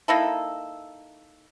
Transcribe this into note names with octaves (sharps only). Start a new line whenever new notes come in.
A#3 D#4 E4 A4